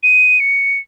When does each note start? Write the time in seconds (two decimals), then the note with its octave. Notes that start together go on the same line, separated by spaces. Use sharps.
0.03 D#7
0.40 C#7